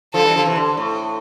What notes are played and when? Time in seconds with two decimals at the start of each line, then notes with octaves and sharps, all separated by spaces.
0.14 D3 F3 A4
0.24 E3 G3
0.35 D3 F3
0.45 C3 E3
0.56 D3
0.77 A2